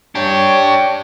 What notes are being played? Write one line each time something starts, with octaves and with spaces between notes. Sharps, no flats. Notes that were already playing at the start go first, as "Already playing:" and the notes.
D4 G4 C#5 C#6